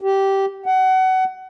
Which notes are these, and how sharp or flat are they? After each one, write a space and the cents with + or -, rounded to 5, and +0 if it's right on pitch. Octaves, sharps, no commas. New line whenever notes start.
G4 -10
F#5 +25